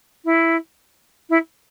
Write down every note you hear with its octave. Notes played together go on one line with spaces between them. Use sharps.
E4
E4